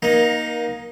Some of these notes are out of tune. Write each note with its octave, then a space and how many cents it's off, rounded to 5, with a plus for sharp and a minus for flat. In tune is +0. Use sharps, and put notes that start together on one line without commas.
A#3 +25 D#4 +0